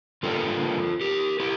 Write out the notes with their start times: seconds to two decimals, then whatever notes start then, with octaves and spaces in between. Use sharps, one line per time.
0.23 D3 G3 A#3 D4 F4 A4
1.01 G4 A#4
1.40 E4 G4